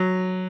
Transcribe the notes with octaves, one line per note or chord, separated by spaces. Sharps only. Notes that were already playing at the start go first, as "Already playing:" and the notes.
Already playing: F#3